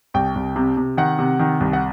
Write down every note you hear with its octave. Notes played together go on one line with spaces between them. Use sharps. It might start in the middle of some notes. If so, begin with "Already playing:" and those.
C2 G5
C2
C3
C3
D#3 F#5
C3
D#3
C2
F#5